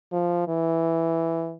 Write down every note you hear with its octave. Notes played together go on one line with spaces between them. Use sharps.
F3
E3